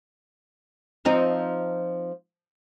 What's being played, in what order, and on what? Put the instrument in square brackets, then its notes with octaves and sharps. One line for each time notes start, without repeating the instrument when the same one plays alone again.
[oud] F3 C4 D#4